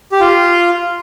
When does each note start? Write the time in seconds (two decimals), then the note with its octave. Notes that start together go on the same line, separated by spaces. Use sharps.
0.12 G4
0.20 F4